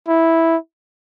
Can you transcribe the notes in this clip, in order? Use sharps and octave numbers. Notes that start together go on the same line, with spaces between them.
E4